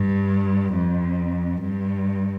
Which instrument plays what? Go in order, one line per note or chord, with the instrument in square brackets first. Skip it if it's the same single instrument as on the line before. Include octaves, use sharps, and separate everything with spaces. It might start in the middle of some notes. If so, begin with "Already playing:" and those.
Already playing: [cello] G2
F2
G2